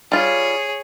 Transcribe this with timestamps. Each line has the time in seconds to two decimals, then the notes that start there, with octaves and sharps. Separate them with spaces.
0.12 G3 F4 G#4 C#5